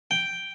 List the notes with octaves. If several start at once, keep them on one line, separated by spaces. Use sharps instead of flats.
G5